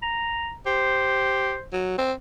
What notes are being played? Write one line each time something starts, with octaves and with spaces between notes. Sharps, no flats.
A#5
G4 C5
F#3
C4